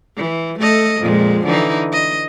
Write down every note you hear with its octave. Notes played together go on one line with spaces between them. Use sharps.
E3
A3 A4 D#5
F2 A#2 G#3
D3 E3 D#4
D#5